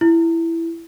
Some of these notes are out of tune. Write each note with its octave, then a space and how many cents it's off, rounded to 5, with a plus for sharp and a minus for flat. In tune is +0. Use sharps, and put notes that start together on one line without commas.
E4 +10